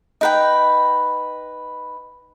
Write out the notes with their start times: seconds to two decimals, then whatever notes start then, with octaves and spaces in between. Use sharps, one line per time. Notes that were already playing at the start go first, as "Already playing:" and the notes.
0.21 D#4 B4 G5